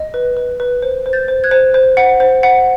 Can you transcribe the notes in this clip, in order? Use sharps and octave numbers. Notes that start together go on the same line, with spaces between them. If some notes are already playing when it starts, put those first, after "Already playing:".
Already playing: D#5
B4
B4
B4
C5
C5
G6 A6
C5
F#6 G#6
C5
C5
F#5
C5
F#5